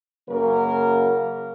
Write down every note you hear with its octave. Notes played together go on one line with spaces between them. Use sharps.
F#2 C#3 F#3 A#3 A#4